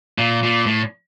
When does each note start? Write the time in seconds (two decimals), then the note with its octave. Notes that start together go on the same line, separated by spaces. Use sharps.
0.18 A#2
0.43 A#2
0.67 A2